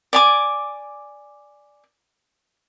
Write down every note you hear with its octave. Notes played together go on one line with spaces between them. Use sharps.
D5 G#5 D6